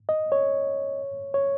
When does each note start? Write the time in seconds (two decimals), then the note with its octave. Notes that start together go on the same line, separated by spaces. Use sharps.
0.09 D#5
0.32 C#5
1.34 C#5